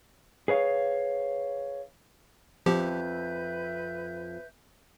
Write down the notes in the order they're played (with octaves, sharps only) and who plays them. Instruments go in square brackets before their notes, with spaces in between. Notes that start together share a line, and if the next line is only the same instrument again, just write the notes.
[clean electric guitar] G#4 B4 C#5 F5
[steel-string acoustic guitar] F2 [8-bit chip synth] F3 G4 [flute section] B4 E5 G6